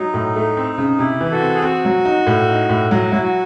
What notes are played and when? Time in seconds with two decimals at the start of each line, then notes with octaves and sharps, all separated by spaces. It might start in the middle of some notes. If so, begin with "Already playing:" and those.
Already playing: F#3 D#4
0.14 A2
0.36 A3
0.57 C4
0.78 C#3
0.99 C3 E4
1.20 E3
1.31 F#4 A4
1.42 C4
1.54 G#4
1.62 C4 F#4
1.85 F#3
2.05 D#4
2.27 A2
2.48 D#4
2.69 A2
2.91 F#3 F#4
3.11 F#3 E4
3.23 F#4